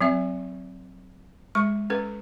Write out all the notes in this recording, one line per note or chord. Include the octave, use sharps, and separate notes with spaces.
F#3 C4 E5
G#3 C#6
C#4 A4 B4